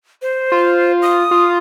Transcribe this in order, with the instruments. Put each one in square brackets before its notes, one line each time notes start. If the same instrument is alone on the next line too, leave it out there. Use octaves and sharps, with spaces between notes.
[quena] C5
[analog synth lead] F4
[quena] D#6
[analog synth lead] F4